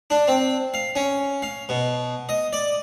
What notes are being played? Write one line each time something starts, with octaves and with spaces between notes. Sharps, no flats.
D4
C4
F5
C#4
F5
B2
D#5
D5